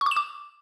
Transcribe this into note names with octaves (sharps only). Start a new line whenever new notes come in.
C#6
D6
E7
D6